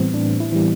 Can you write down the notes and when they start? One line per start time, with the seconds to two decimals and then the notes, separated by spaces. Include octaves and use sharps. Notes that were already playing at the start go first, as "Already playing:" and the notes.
Already playing: A2 E3 G3 B3 C4
0.14 A2 D4
0.40 E4
0.52 E3 G3